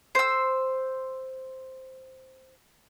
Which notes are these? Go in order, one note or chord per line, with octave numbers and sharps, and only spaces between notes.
C5 E6